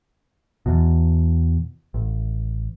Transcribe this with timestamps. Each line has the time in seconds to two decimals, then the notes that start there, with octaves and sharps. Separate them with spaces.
0.66 E2 B2
1.94 A1